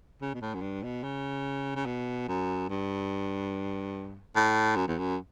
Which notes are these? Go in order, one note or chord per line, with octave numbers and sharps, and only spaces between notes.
C#3
B2
A2
F#2
G2
B2
C#3
C#3
B2
F#2
G2
A2
F#2
E2
F#2